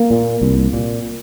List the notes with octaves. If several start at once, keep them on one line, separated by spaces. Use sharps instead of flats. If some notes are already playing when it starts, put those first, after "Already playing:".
Already playing: A#3
A#2
C2
A#2